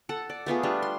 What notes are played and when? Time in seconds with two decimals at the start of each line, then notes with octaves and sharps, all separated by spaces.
0.09 A4 F#5
0.29 D5
0.46 A3 B3 F4 G#4
0.63 G3 D4
0.82 C6